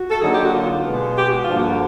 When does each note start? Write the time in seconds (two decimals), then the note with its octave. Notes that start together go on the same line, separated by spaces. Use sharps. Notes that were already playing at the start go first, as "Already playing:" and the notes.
Already playing: F#4
0.11 A4
0.21 D3 F#3 A#3 D#4 G#4
0.32 G4
0.43 F#4
0.53 F4
0.85 B2 G#3 B3
1.17 G4
1.30 F#4
1.43 F4
1.49 G2 D3 F3 A#3 D4
1.57 F#4